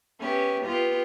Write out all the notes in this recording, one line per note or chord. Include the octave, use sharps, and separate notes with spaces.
B3 C#4 G4 E5
B3 F4 G4